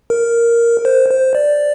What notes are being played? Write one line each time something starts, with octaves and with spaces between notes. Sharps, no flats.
A#4
C5
C5
D5